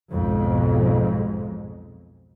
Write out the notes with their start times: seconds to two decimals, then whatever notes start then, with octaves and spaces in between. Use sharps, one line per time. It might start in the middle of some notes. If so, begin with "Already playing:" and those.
0.12 B1 F2 G#2 G#3